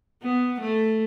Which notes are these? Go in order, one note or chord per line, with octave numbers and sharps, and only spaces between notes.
B3
A3